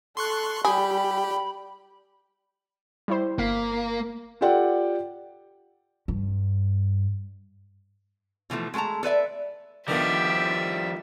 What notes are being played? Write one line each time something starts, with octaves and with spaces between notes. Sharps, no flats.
A4 C6 C#6 F#6
G3 G4 G#4 B5
G3 E4 C5
G1 A#3 F5 B6
F4 G4 A4 D5 F#5 G5
G2
B2 E3 F3 A3
G#3 A3 A4 A5 A#5
A4 B4 D5 E5
D3 D#3 F3 G3 B3 G4 E5